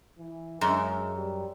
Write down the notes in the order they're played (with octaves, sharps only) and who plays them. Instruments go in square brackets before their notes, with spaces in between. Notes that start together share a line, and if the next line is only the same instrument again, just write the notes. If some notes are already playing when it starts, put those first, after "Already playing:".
[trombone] E3
[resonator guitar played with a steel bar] F#2 [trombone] G#3
[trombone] G3